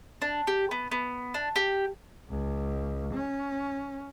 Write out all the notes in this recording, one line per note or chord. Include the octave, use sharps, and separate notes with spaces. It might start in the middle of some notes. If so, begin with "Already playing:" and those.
D4
G4
B3
B3
D4
G4
C#2
C#4